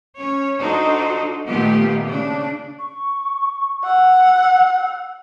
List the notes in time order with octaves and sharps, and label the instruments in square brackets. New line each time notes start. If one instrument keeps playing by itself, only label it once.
[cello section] C#4 C#5
D4 D#4 F#4 A4 C5 D5
A#2 D#3 A3 B3 F4 G4
C#3 D4
[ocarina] C#6
[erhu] F#5 [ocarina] E6